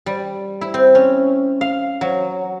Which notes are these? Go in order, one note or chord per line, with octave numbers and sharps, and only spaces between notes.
G3
E4
C4
C#4
F5
F#3